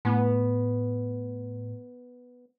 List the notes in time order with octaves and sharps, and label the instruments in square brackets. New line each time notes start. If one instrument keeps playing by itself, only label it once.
[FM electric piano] A2 [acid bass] B3